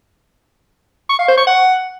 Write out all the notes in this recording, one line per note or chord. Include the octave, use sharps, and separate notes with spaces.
C#6
F5
C5
C#6
F#5